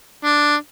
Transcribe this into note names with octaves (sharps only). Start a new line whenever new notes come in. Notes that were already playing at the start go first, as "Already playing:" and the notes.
D4